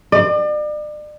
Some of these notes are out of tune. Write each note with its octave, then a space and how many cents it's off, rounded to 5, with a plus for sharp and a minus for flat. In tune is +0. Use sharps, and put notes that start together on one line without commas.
D5 +40